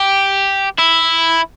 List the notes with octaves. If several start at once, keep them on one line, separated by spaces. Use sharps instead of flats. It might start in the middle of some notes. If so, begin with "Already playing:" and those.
Already playing: G4
E4